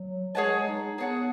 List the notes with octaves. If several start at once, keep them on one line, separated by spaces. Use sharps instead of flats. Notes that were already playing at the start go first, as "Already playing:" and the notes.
Already playing: F#3
G#3 G#4 C#5 F#5 A5
D#4
B3 G#4 C#5 F#5 A5